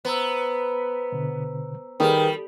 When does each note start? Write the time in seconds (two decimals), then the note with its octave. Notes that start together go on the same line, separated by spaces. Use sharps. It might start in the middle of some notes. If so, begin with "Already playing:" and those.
0.05 B3 C5 A#5 E6
1.12 B2 D3
2.00 D#3 G3 G#4 A4 B4